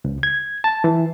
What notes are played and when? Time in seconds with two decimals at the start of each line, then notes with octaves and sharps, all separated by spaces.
0.04 C#2
0.23 G#6
0.64 A5
0.84 E3